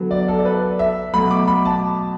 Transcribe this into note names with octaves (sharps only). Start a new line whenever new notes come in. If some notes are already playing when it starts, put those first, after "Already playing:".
Already playing: D3 F#3 B3
D5
A4
D5
B4
E5
B2 F#3 A3 B5
D6
B5
A5